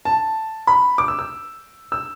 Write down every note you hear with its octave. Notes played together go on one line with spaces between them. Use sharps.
A5
B5
D6
E6
E6
E6